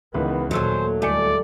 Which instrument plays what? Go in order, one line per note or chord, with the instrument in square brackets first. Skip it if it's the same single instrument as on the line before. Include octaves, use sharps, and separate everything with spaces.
[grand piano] C#2 E3 B4 [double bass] D#3 B3
[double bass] D#2 A#2 [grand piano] D#3 E6 [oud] F#3 A3 C#4 [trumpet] C5
[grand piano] D1 G#5 C#7 [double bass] G3 [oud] A3 [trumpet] D5